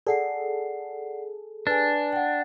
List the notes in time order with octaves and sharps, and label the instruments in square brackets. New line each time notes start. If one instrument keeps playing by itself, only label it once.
[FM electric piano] G#4 A4 [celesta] D5 F#5 C7
[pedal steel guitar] D4 [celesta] B4 G#5
[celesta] F#5 G5